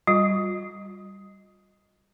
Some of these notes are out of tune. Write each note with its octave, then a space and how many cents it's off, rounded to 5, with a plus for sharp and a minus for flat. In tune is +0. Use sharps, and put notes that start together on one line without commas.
G3 +0 F4 +35